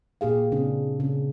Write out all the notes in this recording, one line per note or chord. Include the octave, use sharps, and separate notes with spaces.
A#2 G4 G#4 F5
C#3 C4 D4
C#3